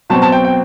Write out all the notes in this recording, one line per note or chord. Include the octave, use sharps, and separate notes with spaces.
B2 F#3 C4 A5
A5
G5
G5